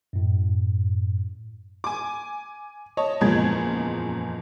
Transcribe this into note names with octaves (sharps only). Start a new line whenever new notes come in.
F#2 A2
G#5 D6
C#5 D#5 A5
F#1 E2 A#2 F3 G#3 G#6